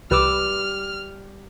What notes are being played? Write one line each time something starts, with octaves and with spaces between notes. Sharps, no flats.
C2 G3 G4 B4 D6 E6 F6 E7